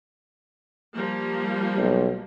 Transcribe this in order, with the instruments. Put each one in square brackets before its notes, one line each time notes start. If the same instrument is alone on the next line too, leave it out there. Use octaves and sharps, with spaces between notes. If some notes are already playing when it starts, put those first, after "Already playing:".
[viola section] F3 G3 A#3
[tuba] B1